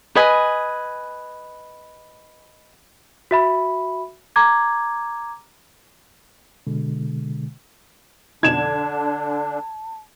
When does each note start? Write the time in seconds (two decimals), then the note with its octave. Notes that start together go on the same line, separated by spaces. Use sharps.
0.15 B4 D#5 G#5
3.31 F#4 E5 B5
4.36 A#5 D6 G#6
6.67 B2 D3 G#3
8.43 F2 B2 D3 D4 D#4 A5 G#6 E7